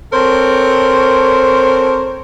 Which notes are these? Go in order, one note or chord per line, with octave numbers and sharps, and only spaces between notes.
C4 A4 A#4 C5 C#5